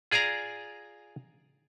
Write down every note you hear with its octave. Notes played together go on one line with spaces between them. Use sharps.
F4 G#4 D5 G#5 A#5